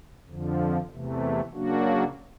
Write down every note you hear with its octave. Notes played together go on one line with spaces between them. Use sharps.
F2 D3 F3
E2 C3 E3 A3
C#3 F#3 A#3 D4 F#4